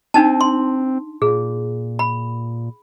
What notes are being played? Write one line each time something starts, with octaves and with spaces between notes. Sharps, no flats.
C4 D4 D#4 A5
C6
A#2 G#4
B5